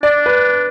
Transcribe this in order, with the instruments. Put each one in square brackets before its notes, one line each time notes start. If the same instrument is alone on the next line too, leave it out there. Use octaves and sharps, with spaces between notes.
[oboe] D4 [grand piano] D5
[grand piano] B4